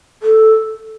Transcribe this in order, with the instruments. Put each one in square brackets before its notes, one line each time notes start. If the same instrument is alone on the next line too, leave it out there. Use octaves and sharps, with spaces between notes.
[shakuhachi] A4